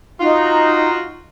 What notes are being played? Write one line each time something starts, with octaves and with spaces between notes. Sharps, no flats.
D#4 F4 F#4